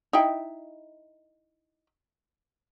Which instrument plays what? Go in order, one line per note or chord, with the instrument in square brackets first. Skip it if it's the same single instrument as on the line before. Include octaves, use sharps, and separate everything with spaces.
[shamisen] D#4 E4 G5